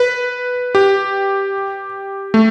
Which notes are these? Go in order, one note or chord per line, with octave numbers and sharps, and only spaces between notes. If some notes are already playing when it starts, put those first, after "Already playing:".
Already playing: B4
G4
A3